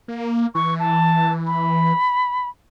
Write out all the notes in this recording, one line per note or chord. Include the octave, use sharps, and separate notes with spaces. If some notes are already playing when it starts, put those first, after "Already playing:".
A#3
E3 C#6
A5
B5